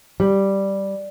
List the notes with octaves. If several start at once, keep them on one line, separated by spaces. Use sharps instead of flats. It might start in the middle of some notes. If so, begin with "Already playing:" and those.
G3